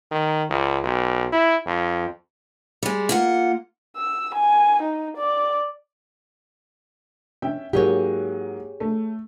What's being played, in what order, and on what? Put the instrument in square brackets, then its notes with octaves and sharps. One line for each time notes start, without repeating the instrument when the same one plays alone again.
[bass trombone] D#3
C#2
B1
E4
F2
[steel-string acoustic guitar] G3 G#3
A#3 F4 F#5
[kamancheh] E6
G#5
D#4
D5
[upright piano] C#4 E5 G5
[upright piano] G#2 F#3 A#3 [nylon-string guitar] G4 G#4 C#5
[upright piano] A3